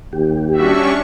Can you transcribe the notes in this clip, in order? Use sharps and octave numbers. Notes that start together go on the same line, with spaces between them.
D#2 G4
G3 C#4 D4 F#4 E5 C#6